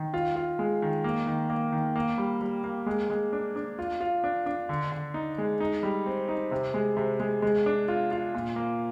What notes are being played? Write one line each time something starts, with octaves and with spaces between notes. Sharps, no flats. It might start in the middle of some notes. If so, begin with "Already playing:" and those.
Already playing: D#3
F4
F4
G#3
D#3
A#3
D#3
A#3
D#3
A#3
G3
G3
A#3
G#3
G#3
D4
D4
F4
F4
D4
D4
D3
D3
D#4
G#3
D#4
G3
C4
D#4
C3
G#3
C3
G#3
G#3
D4
F4
F4
A#2
A#3